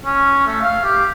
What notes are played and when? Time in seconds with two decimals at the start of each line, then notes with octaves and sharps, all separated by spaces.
0.05 C#4
0.47 A3
0.62 F5
0.84 G4